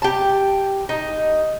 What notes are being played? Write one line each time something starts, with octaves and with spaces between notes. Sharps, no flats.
G4 A5
D#4